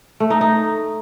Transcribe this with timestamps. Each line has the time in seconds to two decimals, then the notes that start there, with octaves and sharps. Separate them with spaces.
0.20 A3
0.30 D#4
0.41 D#4